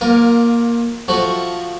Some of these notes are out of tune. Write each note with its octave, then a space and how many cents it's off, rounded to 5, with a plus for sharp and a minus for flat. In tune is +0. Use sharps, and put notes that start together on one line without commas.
A#3 +10 F4 +30 A#4 +0
F3 +0 A3 +0 F#4 +0